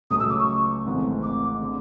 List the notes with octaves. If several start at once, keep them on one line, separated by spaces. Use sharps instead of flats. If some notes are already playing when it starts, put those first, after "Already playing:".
C#2 C#3 F#3 A3 C#4 D#6
E6
D6
C#6
G#1 G#2 E3 A3 C4
D6
D3